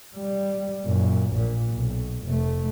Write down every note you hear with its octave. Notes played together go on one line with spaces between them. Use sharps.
G3
F#2 A#2
A#1 A#2
B1
F1 A3